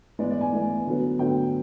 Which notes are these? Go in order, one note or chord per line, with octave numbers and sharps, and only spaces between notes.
E3 G#3 B3 D5
D5
G#5
E3 G#3 B3
D3 F#3 B3
D3 F#3 B3 G5